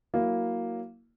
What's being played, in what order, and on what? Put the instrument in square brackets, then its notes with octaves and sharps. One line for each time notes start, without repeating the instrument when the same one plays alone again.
[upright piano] F#3 A#3 E4